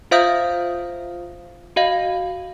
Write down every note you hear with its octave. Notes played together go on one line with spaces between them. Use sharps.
F4 C5 E5 F5 D#6 G6
F#4 D#5 F5